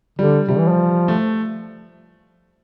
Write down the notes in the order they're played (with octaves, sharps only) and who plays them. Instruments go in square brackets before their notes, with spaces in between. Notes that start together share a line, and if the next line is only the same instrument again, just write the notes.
[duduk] D3 [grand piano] G3
[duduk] C3 [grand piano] G3
[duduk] E3
F3
[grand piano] A3